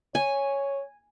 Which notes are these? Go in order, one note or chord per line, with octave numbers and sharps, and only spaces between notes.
C#5 G#5